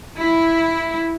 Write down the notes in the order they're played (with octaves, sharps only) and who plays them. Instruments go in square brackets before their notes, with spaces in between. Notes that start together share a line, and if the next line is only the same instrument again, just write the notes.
[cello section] E4